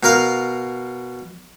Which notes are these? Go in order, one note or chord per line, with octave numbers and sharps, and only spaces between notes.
B2 A#4 F5